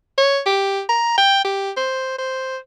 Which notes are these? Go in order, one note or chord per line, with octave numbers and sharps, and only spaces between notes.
C#5
G4
A#5
G5
G4
C5
C5